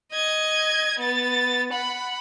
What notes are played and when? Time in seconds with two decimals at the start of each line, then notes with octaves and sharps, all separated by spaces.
0.13 D#5 G#6
0.99 B3 A6
1.72 F#5 B5